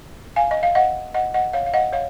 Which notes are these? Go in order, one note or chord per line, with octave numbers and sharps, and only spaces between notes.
F5 G#5
D#5
F5
D#5 F#5
D#5 F#5
D#5 F#5
C#5 F5
F5
D#5 F#5
C#5 F5